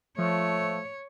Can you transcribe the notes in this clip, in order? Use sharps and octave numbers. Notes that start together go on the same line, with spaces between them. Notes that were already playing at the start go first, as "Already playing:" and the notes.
F3 A3 C#5